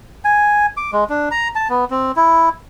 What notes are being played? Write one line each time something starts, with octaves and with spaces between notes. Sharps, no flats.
G#5
D6
G#3
D4
A#5
A5
B3
C4
E4